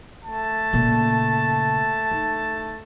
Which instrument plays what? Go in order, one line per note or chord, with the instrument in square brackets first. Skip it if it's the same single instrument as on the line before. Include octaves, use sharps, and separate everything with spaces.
[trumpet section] A3 A5
[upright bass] A#2 C#3
D#4